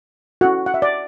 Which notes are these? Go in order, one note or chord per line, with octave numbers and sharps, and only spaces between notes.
C#4 E4 F#4 A4 F#5
F#5
E5
D5